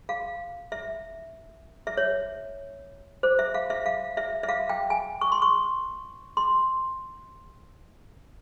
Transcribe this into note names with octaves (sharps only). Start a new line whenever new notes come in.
F5
E5
E5
C#5
C5
E5
F5
E5
F5
E5
E5
F5
G5
G#5
C#6
C6
C#6
C6